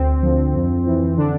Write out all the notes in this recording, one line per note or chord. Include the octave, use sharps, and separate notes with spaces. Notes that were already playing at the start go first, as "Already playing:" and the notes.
Already playing: D2 C4
D3 F3
F2
E3
D3 D4